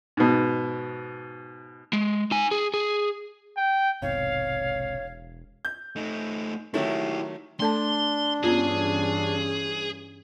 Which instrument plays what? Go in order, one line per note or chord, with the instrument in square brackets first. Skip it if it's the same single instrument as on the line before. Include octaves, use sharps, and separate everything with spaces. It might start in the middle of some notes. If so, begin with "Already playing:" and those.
[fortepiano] G#2 B2
[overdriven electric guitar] G#3
D#4 G#5
G#4
G#4
[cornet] G5
[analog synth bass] E1 [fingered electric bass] B1 G#2 C3 [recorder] C#5 [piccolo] F5
[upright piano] G6
[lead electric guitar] A3 D#4
[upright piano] D#3 F#3 A3 [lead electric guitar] E4 G4
[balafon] A3 A4 A5 [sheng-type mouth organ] D4 [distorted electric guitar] C6
[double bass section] G2 E3 C#4 [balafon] B3 F4 [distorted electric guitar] G#4